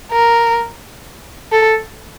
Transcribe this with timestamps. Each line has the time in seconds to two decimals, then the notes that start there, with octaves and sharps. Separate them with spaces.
0.12 A#4
1.52 A4